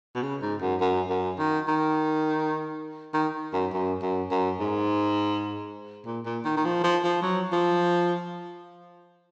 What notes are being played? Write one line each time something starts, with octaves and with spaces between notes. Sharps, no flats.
B2
C#3
G#2
F#2
F#2
F#2
D#3
D#3
D#3
F#2
F#2
F#2
F#2
G#2
A#2
A#2
D#3
D#3
F3
F3
F3
F#3
F3